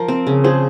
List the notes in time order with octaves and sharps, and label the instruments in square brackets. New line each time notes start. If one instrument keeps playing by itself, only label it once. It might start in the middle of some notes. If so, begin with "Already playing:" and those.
Already playing: [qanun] F3 [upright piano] A#4
[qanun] C4
C#3
[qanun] F3 [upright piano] G#4 C5